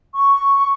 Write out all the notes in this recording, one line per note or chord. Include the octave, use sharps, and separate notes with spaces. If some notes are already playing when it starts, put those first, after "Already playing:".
C#6